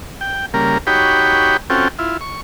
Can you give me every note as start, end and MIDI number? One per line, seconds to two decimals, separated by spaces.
0.21 0.46 79
0.54 0.78 49
0.54 0.78 55
0.54 0.78 58
0.54 0.78 70
0.87 1.57 63
0.87 1.57 66
0.87 1.57 67
0.87 1.57 73
0.87 1.57 79
0.87 1.57 83
1.70 1.88 60
1.70 1.88 61
1.70 1.88 65
1.70 1.88 66
1.70 1.88 69
1.70 1.88 79
1.99 2.17 64
1.99 2.17 65
2.21 2.41 85